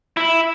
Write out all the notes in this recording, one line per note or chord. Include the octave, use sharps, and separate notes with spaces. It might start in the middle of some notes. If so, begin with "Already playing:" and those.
E4